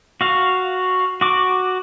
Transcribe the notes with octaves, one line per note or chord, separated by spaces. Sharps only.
F#4 F5
F#4 D6